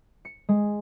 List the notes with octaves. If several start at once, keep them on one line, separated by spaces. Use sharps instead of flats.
C#7
G#3